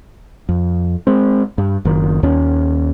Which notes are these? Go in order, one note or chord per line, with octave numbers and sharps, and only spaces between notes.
F2
G#3 C4
G2
F#1 D#3
D#2 C#4